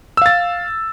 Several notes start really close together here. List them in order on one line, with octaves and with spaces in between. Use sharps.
E6 F5 A6